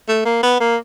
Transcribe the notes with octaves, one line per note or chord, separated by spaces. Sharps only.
A3
A#3
B3
A#3